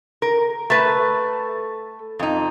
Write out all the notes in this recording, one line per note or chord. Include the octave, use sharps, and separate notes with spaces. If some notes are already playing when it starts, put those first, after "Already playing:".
A#4
A3 A4 B4
F2 D#4